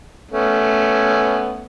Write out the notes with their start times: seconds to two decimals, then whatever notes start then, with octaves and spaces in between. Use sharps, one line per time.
0.31 A3 B3 C#4